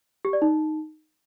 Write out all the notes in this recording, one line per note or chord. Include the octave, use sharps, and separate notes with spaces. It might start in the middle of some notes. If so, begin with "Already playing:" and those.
G4
D5
D#4